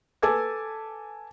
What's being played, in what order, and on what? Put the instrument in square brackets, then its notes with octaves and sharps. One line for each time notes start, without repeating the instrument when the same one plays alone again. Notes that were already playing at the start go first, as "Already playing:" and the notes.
[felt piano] A4 B4 G#5 A5 D6 G#6